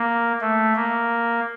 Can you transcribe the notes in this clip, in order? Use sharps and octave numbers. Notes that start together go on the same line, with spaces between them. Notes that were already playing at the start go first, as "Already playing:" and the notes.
Already playing: A#3
A3
A#3